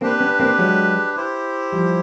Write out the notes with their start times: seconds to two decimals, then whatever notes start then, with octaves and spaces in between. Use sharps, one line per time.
0.01 A#3 C4 D4 G4 B4
0.20 B3 C#4
0.40 A#3 C4
0.59 F#3 G#3
1.16 E4 G4 C5
1.72 F3 G3